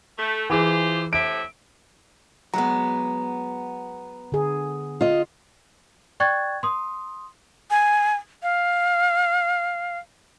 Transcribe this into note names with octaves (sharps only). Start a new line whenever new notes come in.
A3
E3 F4 G4 G#4 C5
A2 C3 E5 D7
F#3 G#3 B3 A#5
D3 G#4
F4 D#5
D5 G5 C#6 F#6 G#6 A6
C6 D#6
G#5
F5